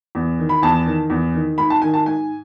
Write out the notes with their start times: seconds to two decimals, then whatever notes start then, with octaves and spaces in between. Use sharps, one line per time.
0.15 E2
0.39 D#3
0.49 B5
0.62 E2 A5
0.86 D#3
1.10 E2
1.34 D#3
1.58 G#2 B5
1.70 A5
1.82 D#3 G#5
1.94 A5
2.06 G#2 G#5